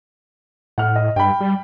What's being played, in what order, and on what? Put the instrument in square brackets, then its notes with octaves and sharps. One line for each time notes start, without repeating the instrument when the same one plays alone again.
[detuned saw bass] A2 [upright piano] F#5 F6
[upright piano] D#5
[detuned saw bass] G2 [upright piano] G5 B5
[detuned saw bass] G3